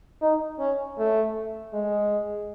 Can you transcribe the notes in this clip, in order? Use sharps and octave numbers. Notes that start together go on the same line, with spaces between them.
D#4
C#4
A3
G#3